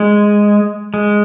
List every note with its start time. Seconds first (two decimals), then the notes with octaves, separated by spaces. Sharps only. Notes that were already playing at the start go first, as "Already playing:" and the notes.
Already playing: G#3
0.94 G#3